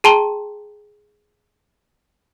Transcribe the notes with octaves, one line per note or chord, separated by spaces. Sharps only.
G#4 G5 A5 A#5 C6 G7